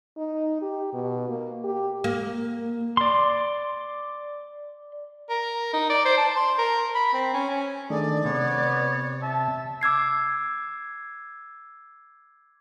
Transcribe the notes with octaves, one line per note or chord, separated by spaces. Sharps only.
D#4
G4
B2
A#3
G4
A#3
D5 C6
A#4
D#4
D5
C5
A5
C6
A#4
B5
C4
C#4
C#4
D#3 A3 D4 G#4 D5
C3 B3 C#5
E5 A5
D6 E6 G#6 C7